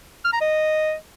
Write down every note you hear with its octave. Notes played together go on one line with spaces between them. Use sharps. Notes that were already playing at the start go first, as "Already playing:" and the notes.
F6
A#5
D#5